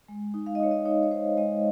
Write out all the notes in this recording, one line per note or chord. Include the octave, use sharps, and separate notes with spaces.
G#3
D#4
F5
D#5
D#4 C#5
D#5
D#4 C#5
C#5
D#4 C5
G#3 D#5